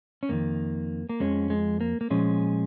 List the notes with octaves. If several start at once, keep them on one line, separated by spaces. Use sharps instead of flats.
C#4
F2 D#3 A#3
A#3
F2 F3 G#3 C#4
G#3
A#3
A#3
A#2 F3 G#3 C#4